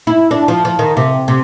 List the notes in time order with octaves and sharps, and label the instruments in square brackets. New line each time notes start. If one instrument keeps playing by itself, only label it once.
[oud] E4
D4
F3
F3
D#3
C3
C3